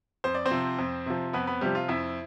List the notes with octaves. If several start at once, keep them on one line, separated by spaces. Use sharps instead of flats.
F2 C5
D5
C4 C5
C3 F3
F2
C3 F3
F2 B3 B4
B3 B4
C3 F3 G3 G4
F4
F2 E4 E5